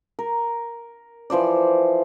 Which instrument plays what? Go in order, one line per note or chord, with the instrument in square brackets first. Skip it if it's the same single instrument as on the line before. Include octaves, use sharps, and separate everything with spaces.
[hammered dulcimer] A#4
E3 F3 C5 D5